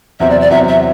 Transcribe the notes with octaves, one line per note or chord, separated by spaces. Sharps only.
E2 C3 F#3 C4 E5
D5
D5
E2 C3 F#3 C4 E5
E5